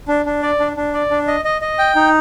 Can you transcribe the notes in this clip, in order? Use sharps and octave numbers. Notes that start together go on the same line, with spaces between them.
D4
D4
D5
D4
D4
D5
D4
D#5
D#5
D#5
G5
D#4